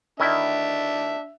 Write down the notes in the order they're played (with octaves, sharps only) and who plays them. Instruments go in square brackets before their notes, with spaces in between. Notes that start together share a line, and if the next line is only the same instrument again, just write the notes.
[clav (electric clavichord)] D#3 E4 [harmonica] D4 E5